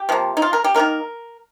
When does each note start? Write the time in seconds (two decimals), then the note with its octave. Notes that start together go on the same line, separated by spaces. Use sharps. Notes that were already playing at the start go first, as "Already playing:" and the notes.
Already playing: G4
0.09 C3 F3 A#3
0.37 D#4
0.42 F4
0.53 A#4
0.64 G4
0.74 D#3 G3 A#3 A#4